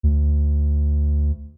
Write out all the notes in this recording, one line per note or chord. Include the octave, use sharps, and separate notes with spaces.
D2